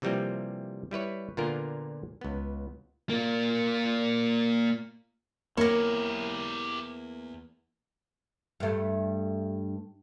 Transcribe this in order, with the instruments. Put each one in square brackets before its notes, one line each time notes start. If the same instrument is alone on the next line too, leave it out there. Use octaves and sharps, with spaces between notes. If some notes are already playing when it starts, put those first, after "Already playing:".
[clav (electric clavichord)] C3 E3 F3 G3 A#3 C4
G3 E4 B4 C#5
A#2 D3 A#3 B3 F4 A#4
C#2 B3
[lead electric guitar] A#3 F4
[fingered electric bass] E2 [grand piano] A#3 [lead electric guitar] E4 G4 [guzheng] A#4 C#5
[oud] G2 A3